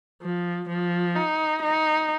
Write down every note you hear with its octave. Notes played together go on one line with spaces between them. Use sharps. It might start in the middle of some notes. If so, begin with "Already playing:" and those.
F3
F3
D#4
D#4